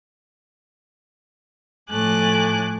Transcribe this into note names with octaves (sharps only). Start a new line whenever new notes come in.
A2 F3 A3 G#5 D6 F#6